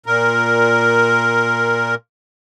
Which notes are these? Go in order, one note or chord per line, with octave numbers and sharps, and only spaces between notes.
A#2 A#4